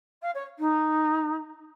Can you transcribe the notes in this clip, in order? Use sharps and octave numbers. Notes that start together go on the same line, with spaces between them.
F5
C#5
D#4